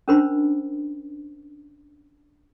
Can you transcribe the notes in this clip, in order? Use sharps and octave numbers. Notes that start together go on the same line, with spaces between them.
C#4 D4 A#4 C5 B5